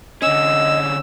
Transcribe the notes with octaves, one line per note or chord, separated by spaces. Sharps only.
D3 C#4 D#5 E6